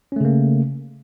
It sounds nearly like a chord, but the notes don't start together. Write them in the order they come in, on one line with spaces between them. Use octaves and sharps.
C#4 A3 C#3 A#3